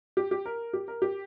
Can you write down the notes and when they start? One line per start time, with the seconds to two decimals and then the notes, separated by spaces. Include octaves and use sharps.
0.17 G4
0.31 G4
0.46 A#4
0.73 G4
0.88 A#4
1.02 G4